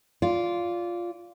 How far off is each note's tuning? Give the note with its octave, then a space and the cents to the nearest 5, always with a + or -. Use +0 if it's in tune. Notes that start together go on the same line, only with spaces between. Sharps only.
F4 +0 D5 -20